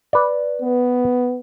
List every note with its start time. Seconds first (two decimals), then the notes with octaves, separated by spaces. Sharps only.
0.13 B4 D5
0.62 B3